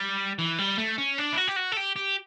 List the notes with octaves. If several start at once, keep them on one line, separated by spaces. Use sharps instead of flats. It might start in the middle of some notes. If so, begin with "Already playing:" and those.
Already playing: G3
E3
G3
A3
C#4
D4
E4
F#4
G4
F#4
A4
G4
G4